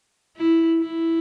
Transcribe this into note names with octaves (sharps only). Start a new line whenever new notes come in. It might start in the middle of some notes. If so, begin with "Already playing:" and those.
E4
E4